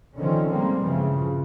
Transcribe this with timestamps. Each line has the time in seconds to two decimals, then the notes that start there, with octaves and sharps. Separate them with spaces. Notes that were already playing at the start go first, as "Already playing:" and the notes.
0.18 D3 D#3 F3 C4 C#4
0.49 G3 G#3 A#3 C4
0.82 G2 C#3 E3 F3